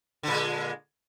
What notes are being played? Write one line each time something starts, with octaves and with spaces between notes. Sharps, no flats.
A#2 D3 G#3